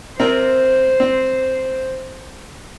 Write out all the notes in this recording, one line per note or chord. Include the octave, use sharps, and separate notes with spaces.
C3 C4 A#4 C5
C4